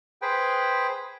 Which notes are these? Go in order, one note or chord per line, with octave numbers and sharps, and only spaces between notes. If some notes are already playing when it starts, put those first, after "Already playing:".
G#4 B4 C5 G5